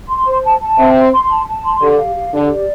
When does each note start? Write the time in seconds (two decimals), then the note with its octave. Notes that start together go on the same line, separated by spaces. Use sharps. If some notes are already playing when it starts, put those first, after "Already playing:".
0.09 C6
0.26 C5
0.44 A5
0.61 A5
0.78 C4 E5
0.96 C6
1.13 C6
1.29 A5
1.47 A5
1.65 C6
1.81 D3 G4
1.98 F5
2.16 G4
2.33 D3 G4
2.50 D5